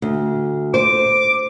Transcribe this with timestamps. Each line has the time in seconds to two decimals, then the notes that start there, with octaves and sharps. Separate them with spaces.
0.02 D2
0.74 C5 D6